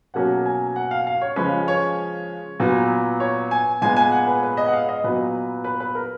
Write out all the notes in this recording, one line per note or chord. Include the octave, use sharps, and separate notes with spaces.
B2 F#3 A#3 C#4 F#5
G#5
F#5
F5
F5
C#5
C#3 F3 G#3 C#4 B4
C#5
A#2 F#3 B3
C#5
G#5
A#2 G#3 B3 G#5
G#5
F#5
B4
B4
D#5
F#5
F5
D#5
A#2 F#3 B3 B4
B4
B4
A#4